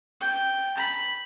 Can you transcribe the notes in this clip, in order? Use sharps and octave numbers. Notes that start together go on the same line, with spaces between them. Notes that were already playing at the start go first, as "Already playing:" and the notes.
G5
B5